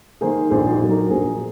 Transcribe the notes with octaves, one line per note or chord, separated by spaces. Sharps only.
D#3 A#3 G#4 C5
A#1 G#4 C5
D#4 F#4
A#2 F#3 A#3
F#4 A#4
A#1 G#4 C5